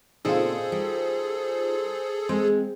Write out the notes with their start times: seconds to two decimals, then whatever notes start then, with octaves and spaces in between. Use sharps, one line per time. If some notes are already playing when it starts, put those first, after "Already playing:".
0.25 A#2 C#3 C4 D#4 F4 G#4 A4 C5
0.72 G3
2.29 G#3 C4 C5